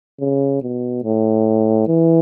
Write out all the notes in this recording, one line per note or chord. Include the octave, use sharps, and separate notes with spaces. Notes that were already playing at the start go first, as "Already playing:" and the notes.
C#3
B2
A2
E3